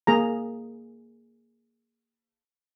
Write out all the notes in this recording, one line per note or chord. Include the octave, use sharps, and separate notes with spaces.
A#3 G#4 A#5